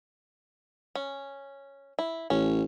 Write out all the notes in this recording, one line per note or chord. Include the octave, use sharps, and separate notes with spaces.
C#4
E4
A1 C#4